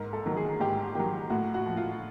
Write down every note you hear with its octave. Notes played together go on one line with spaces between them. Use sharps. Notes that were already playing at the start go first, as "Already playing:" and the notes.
Already playing: G#2 A#4
A4
D#3 F#3
G#4
G#2 G4
D#3 F#3 G4
A2 F#4
F#4
F3
F4